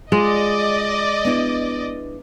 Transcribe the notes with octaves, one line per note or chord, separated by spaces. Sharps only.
G#3 F4 D5 D#5
B3 D4 E4